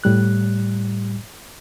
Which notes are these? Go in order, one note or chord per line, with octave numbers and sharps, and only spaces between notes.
A2 G3 F#6